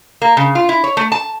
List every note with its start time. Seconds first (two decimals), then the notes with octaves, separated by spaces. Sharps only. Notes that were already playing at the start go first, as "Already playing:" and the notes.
0.22 A#3
0.37 C#3
0.55 F4
0.69 E4
0.84 C#5
0.97 A3
1.12 A5